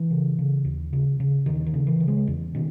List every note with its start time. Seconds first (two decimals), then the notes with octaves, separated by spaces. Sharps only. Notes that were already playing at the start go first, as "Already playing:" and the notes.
Already playing: E3
0.11 C#3
0.39 C#3
0.65 D#2
0.93 C#3
1.20 C#3
1.46 D#2 D#3
1.66 D#3
1.74 C#3
1.87 E3
2.00 C#3
2.08 G#3
2.27 E2
2.55 B2 D#3